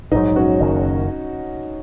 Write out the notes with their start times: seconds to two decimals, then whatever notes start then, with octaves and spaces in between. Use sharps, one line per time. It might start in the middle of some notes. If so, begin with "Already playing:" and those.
0.12 A#1 G#2 F#3 D#4
0.36 C#4 F#4
0.60 F#1 F#2 D#3